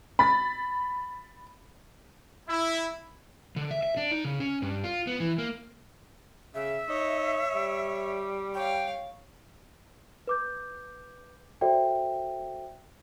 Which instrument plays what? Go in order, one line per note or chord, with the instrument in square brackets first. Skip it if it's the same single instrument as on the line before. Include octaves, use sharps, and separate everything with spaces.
[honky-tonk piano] B5 A6
[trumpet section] E4
[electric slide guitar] D3
E5
E5
D4
D#4
C#3
C#4
G2
F4
B3
E3
A#3
[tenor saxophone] C#3 [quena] E5
[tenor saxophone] D#4 [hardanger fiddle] C#5
[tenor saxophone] G3
[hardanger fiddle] C#5 F5 [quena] G5
[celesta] B4 D6 G6
F#4 A4 C5 D5 E5 G5